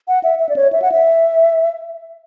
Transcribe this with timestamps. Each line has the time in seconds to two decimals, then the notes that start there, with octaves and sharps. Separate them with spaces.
0.08 F#5
0.24 E5
0.39 E5
0.49 D5
0.56 C#5
0.73 E5
0.82 F#5
0.92 E5